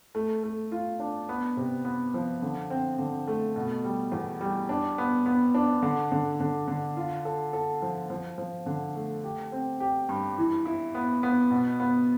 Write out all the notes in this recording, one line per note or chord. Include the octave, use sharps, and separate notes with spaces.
A3
A3
F4
D4
B3
C3
B3
F3
D3
C4
D3
A3
B2
G3
E2
G3
D4
B3
B3
D4
D3
D3
D3
D3
F4
A4
A4
F3
F3
F3
D3
A3
G4
C4
G4
G2
E3
E4
B3
B3
B2
B3